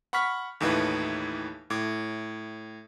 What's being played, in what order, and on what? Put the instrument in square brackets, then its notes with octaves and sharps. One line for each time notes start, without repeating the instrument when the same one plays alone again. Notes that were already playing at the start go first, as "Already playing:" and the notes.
[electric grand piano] F#5 B5 C#6 F6 B6
D#2 A2 E3 D#4 F4 B4
A2 D6 G#6